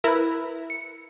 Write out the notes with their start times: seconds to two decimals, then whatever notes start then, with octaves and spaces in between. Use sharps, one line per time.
0.04 E4 A#4 B4
0.70 C#7